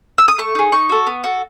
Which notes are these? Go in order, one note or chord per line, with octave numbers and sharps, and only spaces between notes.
E6
D#6
A3 C#6
D#4 G#4
D#4 C#6
F#4 A4
B3
F#4 A4